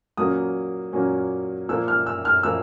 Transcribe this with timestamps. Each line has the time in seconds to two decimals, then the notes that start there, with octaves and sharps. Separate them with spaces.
0.17 A#2 F#3 A#3 C#4 D#6
0.93 A#2 F#3 A#3 C#4
1.69 A#2 F3 A#3 E6
1.88 F6
2.07 E6
2.25 F6
2.43 A#2 F3 A#3 E6